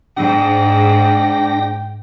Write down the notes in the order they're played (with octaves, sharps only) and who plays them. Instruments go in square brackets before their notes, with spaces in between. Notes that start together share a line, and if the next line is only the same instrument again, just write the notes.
[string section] G#2 [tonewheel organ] D4 A#6 [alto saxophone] G5